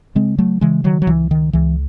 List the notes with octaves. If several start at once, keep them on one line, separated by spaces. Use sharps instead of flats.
C#3 G#3 C4
F#3 A3
C#3 E3 G#3
D#3 F#3
F#3
C#2 E3
D#3
C#2 E3